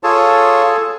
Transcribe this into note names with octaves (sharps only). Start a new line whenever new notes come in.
F4 G#4 A4 C#5 A5